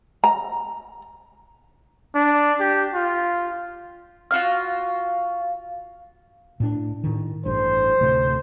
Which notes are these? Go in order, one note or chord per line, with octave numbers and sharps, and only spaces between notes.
A#5
D4
G4
F4
F4 F#4 F5 F6
A2 D4
A2 D#3
A1 G2 C5
D1 C3 A3